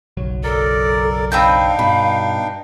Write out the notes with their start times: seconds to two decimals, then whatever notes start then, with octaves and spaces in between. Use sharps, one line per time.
0.17 F#1 B1 F#3
0.44 A4 A#4 D5
1.32 C4 D4 D#4 B4 F5 G5 G6
1.79 G2 B2 B4